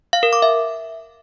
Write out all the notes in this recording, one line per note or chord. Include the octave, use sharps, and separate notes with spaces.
F5
A#4
D6
E5